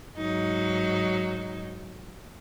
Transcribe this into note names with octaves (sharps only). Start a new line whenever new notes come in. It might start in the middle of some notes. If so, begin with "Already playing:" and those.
G#2 F#3 D#4